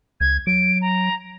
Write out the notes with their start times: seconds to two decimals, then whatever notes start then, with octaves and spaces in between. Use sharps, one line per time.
0.21 C#2 G#6
0.47 F#3 D7
0.82 A#5